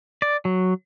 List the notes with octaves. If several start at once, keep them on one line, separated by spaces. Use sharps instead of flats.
D5
F#3